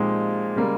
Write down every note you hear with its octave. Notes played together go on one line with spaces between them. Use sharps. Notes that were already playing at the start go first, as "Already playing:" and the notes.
Already playing: A#2 F3 G#3 C4 D#4 G4
C#3 G3 A#3